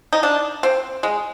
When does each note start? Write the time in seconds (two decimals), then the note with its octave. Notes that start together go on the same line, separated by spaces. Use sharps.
0.13 D#4
0.23 D4
0.63 C4
1.03 G#3